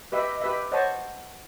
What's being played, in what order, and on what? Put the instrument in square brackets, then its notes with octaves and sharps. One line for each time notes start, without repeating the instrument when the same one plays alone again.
[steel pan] G4 B4 E5 [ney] D#5
[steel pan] G4 B4 E5
[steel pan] C5 D#5 F#5 A5 C#6 [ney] C#5